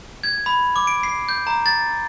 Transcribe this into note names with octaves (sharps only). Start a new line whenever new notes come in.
G#6
B5
D6
D7
C7
G6
A#5
A6